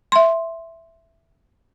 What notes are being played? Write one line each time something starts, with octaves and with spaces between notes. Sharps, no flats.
E5 C6